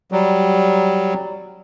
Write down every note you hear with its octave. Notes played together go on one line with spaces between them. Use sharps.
F#3 G3